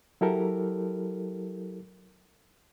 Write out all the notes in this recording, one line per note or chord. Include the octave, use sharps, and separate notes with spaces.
F#3 E4 G4 A4 A#4